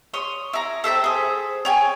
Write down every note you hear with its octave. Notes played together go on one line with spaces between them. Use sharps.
C#5 C6 D#6
E4 A#5
A4 C5 E5 G5
G#4 C5
C#5 G5 G#5